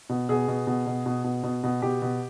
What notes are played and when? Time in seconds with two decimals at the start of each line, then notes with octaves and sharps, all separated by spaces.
0.09 B2
0.29 B2 G#4
0.48 B2
0.67 B2
0.87 B2
1.06 B2
1.24 B2
1.43 B2
1.64 B2
1.82 B2 G4
2.02 B2